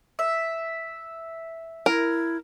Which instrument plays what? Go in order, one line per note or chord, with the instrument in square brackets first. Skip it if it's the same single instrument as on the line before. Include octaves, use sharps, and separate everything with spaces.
[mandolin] E5
[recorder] E4 [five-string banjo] A#4